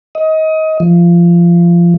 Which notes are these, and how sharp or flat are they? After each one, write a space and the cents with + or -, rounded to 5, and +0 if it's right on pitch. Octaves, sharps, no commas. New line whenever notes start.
D#5 +25
F3 -20